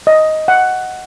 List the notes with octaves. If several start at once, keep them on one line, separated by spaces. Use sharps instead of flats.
D#5
F#5